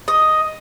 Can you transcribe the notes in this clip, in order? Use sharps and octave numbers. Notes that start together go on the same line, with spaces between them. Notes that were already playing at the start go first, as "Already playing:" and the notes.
D#5